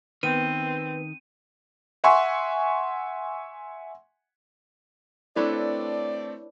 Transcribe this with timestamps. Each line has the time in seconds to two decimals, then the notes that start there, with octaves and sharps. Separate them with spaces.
0.23 D#3 B3 C4 B4 D#7
2.04 E5 F#5 G#5 C6 C#6
5.36 A3 C4 D4 E4 A4 B4 C#5 D5